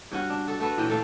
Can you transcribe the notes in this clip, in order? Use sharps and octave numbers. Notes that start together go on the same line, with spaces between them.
G2 C#4 F#4 F#5
D4
F#4 A4
A3 F#4 A4 B4
A#2 E3 C#4 G5
A3 A4 F5